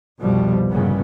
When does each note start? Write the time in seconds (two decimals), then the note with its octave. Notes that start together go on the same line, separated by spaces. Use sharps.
0.20 C2 F2 B2 F3 G3
0.70 G1 G2 A#2 C#3 B3